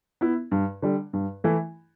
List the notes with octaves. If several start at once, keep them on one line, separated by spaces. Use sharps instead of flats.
B3 E4
G2
D3 G3
G2
E3 A3 E4